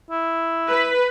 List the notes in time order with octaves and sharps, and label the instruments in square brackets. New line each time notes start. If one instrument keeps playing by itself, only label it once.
[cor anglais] E4
[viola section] B4